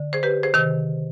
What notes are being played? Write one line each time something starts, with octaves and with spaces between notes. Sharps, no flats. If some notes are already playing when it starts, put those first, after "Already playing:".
Already playing: D3
G#4 C5
G4 B4
G#4 C5
C3 D#3